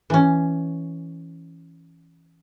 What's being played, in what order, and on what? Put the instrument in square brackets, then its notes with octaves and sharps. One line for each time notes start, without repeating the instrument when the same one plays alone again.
[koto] E3 C#4